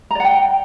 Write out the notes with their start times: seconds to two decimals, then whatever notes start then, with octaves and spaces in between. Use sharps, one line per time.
0.11 A#5
0.15 D5
0.20 F#5
0.24 G5